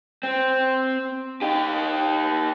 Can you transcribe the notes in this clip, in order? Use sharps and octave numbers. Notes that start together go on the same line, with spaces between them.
C4
D#4 G4